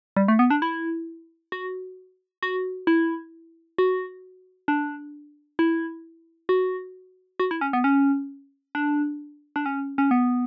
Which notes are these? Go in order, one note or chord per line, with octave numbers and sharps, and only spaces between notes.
G3
A3
B3
D4
E4
F#4
F#4
E4
F#4
D4
E4
F#4
F#4
E4
C#4
B3
C#4
D4
D4
C#4
C#4
B3